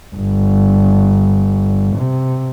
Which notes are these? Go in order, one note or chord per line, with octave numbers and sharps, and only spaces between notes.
G1
C3